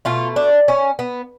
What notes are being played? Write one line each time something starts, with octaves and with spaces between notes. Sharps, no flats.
B2 A3 F4
D4
C#4
B3